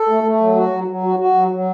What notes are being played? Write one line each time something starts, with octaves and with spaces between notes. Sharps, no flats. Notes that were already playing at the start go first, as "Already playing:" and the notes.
Already playing: A4
A3
A3
F#3
F#4
F#3
F#3
F#4
F#4
F#3
F#3